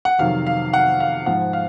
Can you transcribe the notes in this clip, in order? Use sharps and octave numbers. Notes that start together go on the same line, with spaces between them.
F#5
F2 C3 D#3 F#3 F5
F5
F#5
F5
G#2 F3 F#5
F5